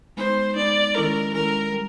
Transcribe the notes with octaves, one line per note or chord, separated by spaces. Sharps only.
G#3 B3 D#4 C5
G#3 B3 D#4 D5
D#3 G#3 C#4 E4 A4 A#4
D#3 G#3 C#4 E4 A4 A#4
G3